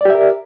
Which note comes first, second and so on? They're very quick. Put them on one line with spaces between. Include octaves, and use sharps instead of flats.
D5 G4 E5 A#4